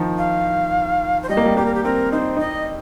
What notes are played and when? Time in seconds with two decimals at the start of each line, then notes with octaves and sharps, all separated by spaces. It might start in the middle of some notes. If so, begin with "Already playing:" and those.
Already playing: D#3 F3
0.18 F5
1.23 C5
1.29 G3 D#5
1.37 A#3
1.46 G3
1.57 A#3 G4
1.66 A#4
1.74 G4
1.84 C4 A#4
2.12 D#4 C5
2.37 D#4 D#5